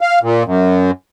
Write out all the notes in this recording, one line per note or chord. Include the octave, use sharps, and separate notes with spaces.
F5
A#2
F#2